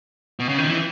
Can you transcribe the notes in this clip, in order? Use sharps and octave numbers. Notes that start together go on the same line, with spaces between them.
B2
C#3
D#3
E3